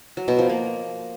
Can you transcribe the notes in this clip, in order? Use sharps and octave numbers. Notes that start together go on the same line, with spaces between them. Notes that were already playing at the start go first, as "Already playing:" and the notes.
F#3
B2
F3
A#3